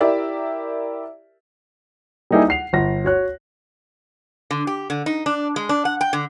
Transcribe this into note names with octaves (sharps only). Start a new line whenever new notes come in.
E4 G4 A#4 D5 E5
G3 A#3 D#4 E4 G4 G#4
F#5 C7 F7
G1 A#6
F#4 C#5 F#6
D3
G4
D3
D#4
D4
G#3
D4
F#5
G5
D3